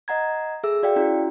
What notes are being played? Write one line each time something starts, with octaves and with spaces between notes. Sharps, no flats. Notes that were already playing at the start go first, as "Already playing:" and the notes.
D#5 F#5 A#5 G#6
G#4 A4 E5 E6
F#4 D5 F5 G5
C#4 E4 F#4